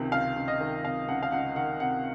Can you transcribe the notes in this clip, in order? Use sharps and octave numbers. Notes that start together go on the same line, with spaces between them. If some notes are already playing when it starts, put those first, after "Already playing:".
Already playing: C#2 C3 D#3
C#2 F5
C#2
D#5
D#3
C3 F5
C#2 F#5
F5
C#2 F#5
D#3 F#5
C3 F#5